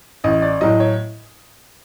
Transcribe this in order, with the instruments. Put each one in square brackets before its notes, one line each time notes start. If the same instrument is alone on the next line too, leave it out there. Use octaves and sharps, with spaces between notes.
[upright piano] A1 D#5
D5
A2 F#3 D#5
C#5